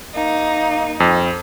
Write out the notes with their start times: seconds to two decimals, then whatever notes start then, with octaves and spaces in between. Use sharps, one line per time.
0.15 A#3 D#4
1.00 F2